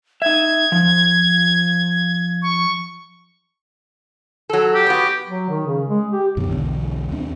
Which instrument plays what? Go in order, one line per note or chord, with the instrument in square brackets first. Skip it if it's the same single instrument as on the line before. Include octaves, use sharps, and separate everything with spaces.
[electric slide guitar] D#4 E5 [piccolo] G#6
[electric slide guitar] F3
[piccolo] C#6
[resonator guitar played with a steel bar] F#3 A4
[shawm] G4
[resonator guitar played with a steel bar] B3 F#4
[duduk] F#3
D#3
C#3
G#3
G4
[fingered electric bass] F#2 B2 D#3
B1 E2 D3
D#2 C4 D4